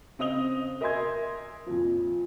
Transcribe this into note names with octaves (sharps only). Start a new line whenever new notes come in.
C#3 C4 D#5 D#6 F7 G7
A#4 D#5 E5 G#5 C6 G#6
F2 A#2 F3